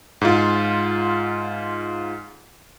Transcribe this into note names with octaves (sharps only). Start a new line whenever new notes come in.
G#2 F4